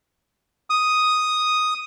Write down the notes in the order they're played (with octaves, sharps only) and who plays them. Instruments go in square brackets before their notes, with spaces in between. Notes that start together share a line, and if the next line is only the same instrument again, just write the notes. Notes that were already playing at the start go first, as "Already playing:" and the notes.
[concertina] D#6